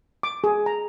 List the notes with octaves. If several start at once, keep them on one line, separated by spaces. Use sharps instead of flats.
D6
G#4
A#5